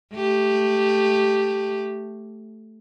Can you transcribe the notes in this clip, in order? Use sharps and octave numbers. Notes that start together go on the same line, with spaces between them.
A3 G4